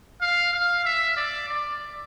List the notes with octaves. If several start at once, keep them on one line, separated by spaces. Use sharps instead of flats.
F5
F5
E5
D5
D5